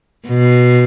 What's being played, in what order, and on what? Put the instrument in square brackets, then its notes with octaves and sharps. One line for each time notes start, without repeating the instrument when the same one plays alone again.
[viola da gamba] B2